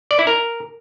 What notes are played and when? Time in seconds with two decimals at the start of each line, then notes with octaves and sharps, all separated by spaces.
0.11 D5
0.19 E4
0.27 A#4